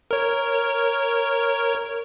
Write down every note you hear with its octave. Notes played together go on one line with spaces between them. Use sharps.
A#4 C#5